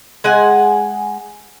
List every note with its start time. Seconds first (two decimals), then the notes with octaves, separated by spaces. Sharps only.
0.24 G#3 F#5 G#5